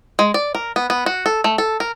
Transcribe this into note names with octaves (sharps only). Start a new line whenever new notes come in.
G#3
D5
A#4
B3
B3
F#4
A4
A3
A4
A#4